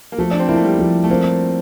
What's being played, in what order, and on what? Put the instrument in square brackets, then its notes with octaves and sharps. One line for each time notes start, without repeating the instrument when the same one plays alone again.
[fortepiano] A#3
[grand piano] F3 [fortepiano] A3
[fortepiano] D4
C4
[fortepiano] A#3 [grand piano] E4
[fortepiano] A3
G3
[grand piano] F3
[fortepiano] A3
[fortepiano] A#3 [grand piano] C4